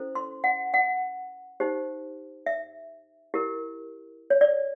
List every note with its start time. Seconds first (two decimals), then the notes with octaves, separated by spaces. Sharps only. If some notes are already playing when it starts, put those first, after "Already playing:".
Already playing: C#4 E4 A4 C5
0.15 C6
0.44 F#5
0.74 F#5
1.60 D#4 G4 C5
2.46 E5
3.34 E4 G4 A#4
4.30 C#5
4.41 D5